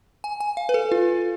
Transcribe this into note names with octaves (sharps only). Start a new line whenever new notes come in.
G#5
G#5
F5
B4
A4
F4